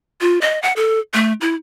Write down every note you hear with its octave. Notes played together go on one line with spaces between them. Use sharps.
F4
D#5
F#5
A4
A3
E4